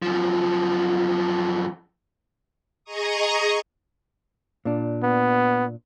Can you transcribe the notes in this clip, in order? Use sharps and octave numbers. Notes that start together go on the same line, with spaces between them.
F#2 F3
G#4 D#5 A#5 C#6 D#6
A#2 D4
B3